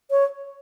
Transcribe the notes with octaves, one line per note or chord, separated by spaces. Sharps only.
C#5